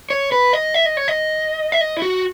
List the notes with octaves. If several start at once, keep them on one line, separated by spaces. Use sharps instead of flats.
C#5
B4
D#5
E5
D#5
C#5
D#5
E5
D#5
E4
F#4